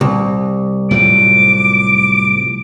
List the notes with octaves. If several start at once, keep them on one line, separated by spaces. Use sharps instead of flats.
C2
A2 F3 F#3 D6